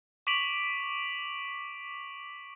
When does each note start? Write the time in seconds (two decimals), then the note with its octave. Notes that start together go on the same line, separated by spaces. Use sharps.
0.27 C#6 D6 B6 D7 F7 F#7